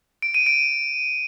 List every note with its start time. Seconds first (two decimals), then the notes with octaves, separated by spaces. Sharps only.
0.22 D7
0.34 D#7
0.46 D7